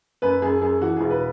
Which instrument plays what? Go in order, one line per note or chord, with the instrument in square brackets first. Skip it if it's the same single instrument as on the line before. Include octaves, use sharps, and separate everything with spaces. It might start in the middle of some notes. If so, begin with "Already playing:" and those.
[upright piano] F#2 B4
F#2 G#4
F#2 G#4
E3 F#4
E1 G#4
B4